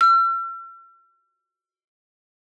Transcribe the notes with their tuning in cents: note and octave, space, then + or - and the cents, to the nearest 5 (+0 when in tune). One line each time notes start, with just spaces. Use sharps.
E6 +45